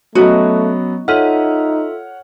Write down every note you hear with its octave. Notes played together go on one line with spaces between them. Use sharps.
F#3 A3 B3 C#4 F#4 D#5
D#4 F4 A4 C#5 E5 F#5 F6